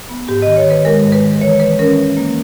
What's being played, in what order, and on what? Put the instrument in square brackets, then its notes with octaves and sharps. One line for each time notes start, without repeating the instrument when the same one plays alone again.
[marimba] B3
G#2 G4
D#5
D#3
C#5
D#3 B4
G#3 A#4
G#2
B4
D#3
E3 C#5
E3 B4
C#4 A#4
E3
A#3